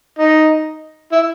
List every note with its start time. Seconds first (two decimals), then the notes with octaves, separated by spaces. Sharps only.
0.19 D#4
1.12 E4